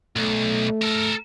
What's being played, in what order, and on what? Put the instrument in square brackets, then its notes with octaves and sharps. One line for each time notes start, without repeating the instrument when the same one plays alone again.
[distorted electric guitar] B1 [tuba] A3
[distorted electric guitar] A4 A#4